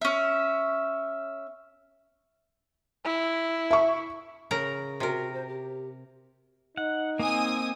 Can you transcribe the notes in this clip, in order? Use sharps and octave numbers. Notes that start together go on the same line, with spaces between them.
C#4 E5
E4
E5 C#6
C#3 A#4 A#5
C3 F#4 A#4
C5
G4
D#4 F#5
A#3 C4 G#5 D#6